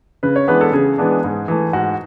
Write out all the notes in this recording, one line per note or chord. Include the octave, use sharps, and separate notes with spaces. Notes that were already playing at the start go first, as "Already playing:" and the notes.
C#3 B4
C#5
E3 G#3 B3 D4 B4
A4
C#3 G#4
E3 G#3 B3 D4
G#2
E3 A3
G#2 F#4